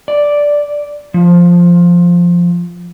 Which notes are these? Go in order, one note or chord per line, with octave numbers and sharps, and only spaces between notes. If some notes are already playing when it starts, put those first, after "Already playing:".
D5
F3